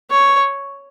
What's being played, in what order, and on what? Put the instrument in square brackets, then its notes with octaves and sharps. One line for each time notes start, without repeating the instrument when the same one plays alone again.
[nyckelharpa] C#5